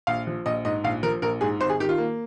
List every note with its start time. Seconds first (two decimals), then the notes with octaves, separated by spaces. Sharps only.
0.07 A#1 F5
0.27 F3
0.46 A#1 D#5
0.65 G#2 D#5
0.84 A#1 F5
1.03 F3 A#4
1.22 A#1 A#4
1.41 G#2 G#4
1.60 G#1 C5
1.70 G#4
1.80 D#3 G4
1.89 F4
1.98 A#3